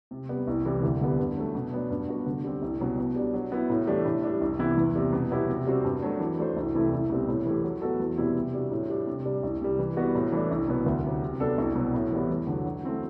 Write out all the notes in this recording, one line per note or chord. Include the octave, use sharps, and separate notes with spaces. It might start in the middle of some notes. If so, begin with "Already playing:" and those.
C3
G3 B3
C2
C3 E3 G3
D2
D3 G3 B3
G2
F#3 A3
B2
F#3 B3 D4
G2
F#3 B3 F#4
D3
G3 C4 G4
C2
B2 F#3
B2
G3 D4
F#3
B3 E4
A2
E3 A3 D4 G4
A2
G3 D4
C2
C3 E3 B3 E4
E2
C3 G3
B2
F#3 B3 E4 G4
C3
G3 C4 F#4 C5
G2
F#3 A3 D4
E3
A3 D4 F#4 C5
C2
C3 E3 A3 E4
C2
B2 G3 C4
A2
E3 A3 E4 G4
F#3
B3 F#4 A4
E2
B2 G3 C4 E4
C3
G3 D4 F#4
A2
G3 D4 G4
C3
G3 D4
C2
C3 G3
E3
G3 B3 F#4
A2
E3 A3 D4
C2
B2 F#3 B3
D2
C3 F#3
C3
F#3 B3 D4 A4
C2
B2 F#3
A2
E3 G3 B3
E2
D3 F#3
F#3
A3 C4 E4